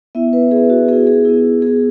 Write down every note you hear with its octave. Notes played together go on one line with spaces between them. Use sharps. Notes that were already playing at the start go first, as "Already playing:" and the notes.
B3 E4 E5
B4
B3 E4 G#4
F#4
B3 E4 G#4
G#4
B3 E4
B3 E4 G#4